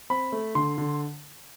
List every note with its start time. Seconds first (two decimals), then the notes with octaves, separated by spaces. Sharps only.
0.10 C4 B5
0.32 A3
0.55 D3 C6
0.78 D3